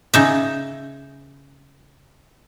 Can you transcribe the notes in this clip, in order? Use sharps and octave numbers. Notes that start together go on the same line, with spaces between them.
C#3 D#4 E5